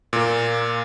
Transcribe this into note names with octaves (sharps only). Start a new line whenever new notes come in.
A#2 A#3